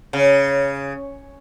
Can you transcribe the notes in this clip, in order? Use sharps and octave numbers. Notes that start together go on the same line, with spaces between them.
C#3